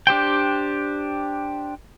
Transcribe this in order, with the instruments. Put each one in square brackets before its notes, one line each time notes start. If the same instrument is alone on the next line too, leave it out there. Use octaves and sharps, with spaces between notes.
[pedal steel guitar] D4 G4 C5 G5